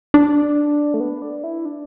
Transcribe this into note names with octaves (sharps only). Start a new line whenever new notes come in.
D4
A3
B3
D4
E4
D4